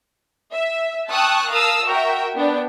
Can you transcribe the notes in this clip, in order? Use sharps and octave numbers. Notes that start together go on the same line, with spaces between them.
E5
G5 A5 C#6 D#6 E6 F#6
A#4 F5 A5 D#6 E6
F#4 A#4 E5 G5
B3 D4 G5